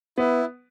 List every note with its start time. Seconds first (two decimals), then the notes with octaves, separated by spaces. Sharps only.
0.18 B3 E4